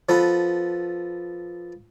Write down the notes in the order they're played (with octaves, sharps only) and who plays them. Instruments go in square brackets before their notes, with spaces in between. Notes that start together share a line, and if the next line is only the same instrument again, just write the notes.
[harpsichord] F3 B3 A4 B4